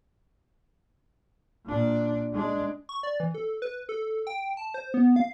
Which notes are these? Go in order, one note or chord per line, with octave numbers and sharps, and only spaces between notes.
A#2 D4
G#3 D4
C#6
D5
E3
A4
B4
A4
G5
A5
C5
B3
F5